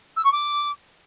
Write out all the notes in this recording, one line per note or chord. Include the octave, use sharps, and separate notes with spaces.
E6
C#6
D6